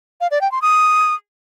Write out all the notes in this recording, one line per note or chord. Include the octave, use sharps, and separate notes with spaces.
F5
D5
G5
C6
D#6